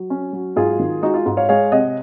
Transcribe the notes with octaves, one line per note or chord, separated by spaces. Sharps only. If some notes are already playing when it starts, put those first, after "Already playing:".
Already playing: F#3
C#4
F#3
G#2 F4 G#4
D#3
G#3 D#4 F#4
F4
G#2
C#5 F5
G#3 C#5 F5
C3 D#5 F#5